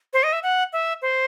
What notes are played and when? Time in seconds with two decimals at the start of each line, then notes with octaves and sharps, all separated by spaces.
0.13 C5
0.23 D#5
0.33 E5
0.43 F#5
0.73 E5
1.02 C5